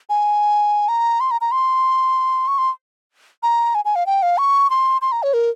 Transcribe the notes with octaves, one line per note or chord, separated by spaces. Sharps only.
G#5
A#5
C6
A#5
A#5
C6
C#6
C6
A#5
G#5
G#5
F5
G5
F5
C#6
C6
C6
A#5
C#5
A#4